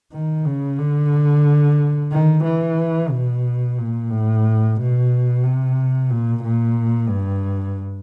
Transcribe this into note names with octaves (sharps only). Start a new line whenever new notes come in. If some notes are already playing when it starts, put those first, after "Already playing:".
D#3
C#3
D3
D#3
E3
B2
A#2
A2
B2
C3
A#2
A#2
G2